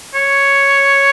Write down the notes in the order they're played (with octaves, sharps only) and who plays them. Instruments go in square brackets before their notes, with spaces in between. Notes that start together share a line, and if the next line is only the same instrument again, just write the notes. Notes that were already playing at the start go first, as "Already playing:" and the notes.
[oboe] C#5